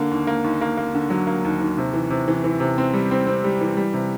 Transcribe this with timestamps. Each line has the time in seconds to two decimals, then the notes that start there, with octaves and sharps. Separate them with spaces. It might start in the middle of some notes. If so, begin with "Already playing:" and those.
Already playing: D3 A#3
0.11 D#2
0.27 A#3
0.44 D#2
0.61 A#3
0.77 A#3
0.95 D3
1.10 F#3
1.27 A#3
1.45 D#2
1.61 D#2
1.78 C3
1.94 E3
2.10 C3
2.28 E3
2.44 E3
2.60 C3
2.78 C4
2.93 G3
3.11 C4
3.27 C4
3.44 G3
3.61 E3
3.77 G3
3.94 C3